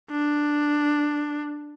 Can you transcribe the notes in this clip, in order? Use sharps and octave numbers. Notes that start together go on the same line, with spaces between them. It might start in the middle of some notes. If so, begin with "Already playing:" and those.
D4